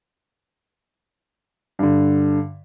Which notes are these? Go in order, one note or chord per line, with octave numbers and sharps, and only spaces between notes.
G2 D3